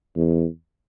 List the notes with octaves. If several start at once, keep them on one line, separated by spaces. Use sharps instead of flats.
E2